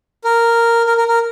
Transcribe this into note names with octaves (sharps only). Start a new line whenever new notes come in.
A#4
A#4
A#4
A#4